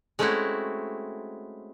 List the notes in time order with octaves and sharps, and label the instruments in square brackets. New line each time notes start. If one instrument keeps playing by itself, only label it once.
[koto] G#3 A3 C4 C#4 E4 F#4